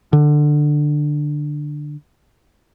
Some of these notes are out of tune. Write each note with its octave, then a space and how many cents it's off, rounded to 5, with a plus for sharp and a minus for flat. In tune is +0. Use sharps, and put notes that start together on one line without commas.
D3 +15